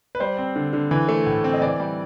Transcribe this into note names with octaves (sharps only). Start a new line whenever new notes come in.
B4
G3 C5
C4
D3
D3
E3
A3
A2
C4
D#5
E3 D5
G3